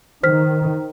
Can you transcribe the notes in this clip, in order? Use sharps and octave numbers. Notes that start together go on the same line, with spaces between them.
D#3 C5 F6 B6